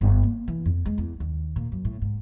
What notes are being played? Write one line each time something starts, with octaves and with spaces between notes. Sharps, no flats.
G1
A#3
E3
F2
G#3
E2
D#2
A#2
F#2
A2
G#2